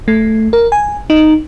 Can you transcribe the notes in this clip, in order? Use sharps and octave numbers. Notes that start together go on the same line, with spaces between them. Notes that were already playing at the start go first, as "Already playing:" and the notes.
A3
A#4
G#5
D#4